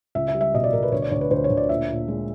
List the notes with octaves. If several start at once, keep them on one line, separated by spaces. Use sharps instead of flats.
C#2 E5
E5
G3
E5
B2 D#5
D5
B2 A#4
B4
D2 C#5
D5
D2 C#5
B4
D2 C5
C#5
D2
D5
A#2 E5
A#2
G#3